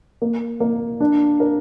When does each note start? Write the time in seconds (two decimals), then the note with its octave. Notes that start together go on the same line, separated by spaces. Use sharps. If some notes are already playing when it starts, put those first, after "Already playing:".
0.22 A#3
0.60 A#3
1.00 D4
1.40 A#4